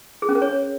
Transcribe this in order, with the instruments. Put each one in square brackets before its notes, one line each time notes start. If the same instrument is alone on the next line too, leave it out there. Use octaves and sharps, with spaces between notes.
[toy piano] G#4
C#4
A#4
C#5